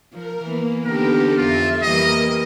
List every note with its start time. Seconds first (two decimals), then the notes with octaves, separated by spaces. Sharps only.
0.13 F3 A#4
0.44 E3 A#3 B3
0.85 D3 D#3 B3 G4 A4 A#4
1.37 F2 F4 E5
1.82 E3 G3 A#3 A#4 D#5